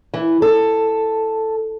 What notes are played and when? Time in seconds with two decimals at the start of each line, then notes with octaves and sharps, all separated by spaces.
0.14 E3
0.42 A4